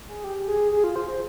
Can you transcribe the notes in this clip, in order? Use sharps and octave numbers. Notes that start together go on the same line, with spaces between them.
G#4
G4
G#4
G#4
F4
C5
C5